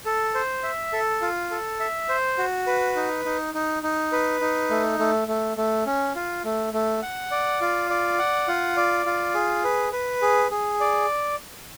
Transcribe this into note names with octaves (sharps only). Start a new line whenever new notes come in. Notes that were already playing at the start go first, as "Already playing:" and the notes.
A4
C5
E5
A4
F4
A4
E5
C5
F#4
B4
D#4
D#4
D#4
D#4
B4
D#4
A3
A3
A3
A3
C#4
F4
A3
A3
F#5
D5
F4
D5
F#5
F4
D5
F4
G#4
B4
B4
G#4
G#4
D5